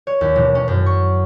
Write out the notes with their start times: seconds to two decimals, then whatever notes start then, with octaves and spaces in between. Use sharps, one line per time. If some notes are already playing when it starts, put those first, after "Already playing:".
0.07 C#5
0.21 D#2
0.36 E1
0.55 C#4
0.68 F#2
0.86 C#6